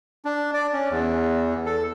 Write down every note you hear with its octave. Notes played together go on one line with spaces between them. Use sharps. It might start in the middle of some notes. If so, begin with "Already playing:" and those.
D4
D5
C#4
E2
A4